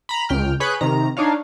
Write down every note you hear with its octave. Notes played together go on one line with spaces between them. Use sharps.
A#5 B5
C#2 G5 F6
G#4 B4 C#5 B5 F#6 G6
C3 D#3 A#5
D4 D#4 C#5 F5